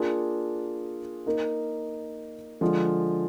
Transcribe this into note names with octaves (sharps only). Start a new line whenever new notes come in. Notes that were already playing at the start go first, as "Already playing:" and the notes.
Already playing: A#3 D4 F4 G#4
A#3 D#4 A#4
D3 F3 G#3 D4 F4